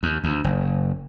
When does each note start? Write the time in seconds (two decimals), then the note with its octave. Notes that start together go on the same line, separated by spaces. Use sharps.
0.03 D#2
0.24 D2
0.44 F#1